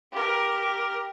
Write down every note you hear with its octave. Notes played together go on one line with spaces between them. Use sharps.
G4 A#4